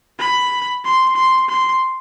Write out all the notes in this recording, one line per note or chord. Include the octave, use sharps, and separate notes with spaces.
B5
C6
C6
C6